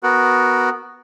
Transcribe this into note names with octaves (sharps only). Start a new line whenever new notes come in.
B3 F#4 A#4